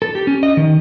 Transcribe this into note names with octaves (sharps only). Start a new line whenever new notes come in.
A4
G4
C#4
D#5
D#3